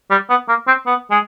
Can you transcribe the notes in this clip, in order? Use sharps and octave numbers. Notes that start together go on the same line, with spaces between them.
G3
B3
A#3
C4
B3
G#3